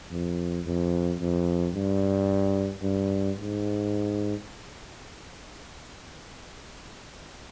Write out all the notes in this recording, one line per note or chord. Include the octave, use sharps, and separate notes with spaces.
F2
F2
F2
G2
G2
G#2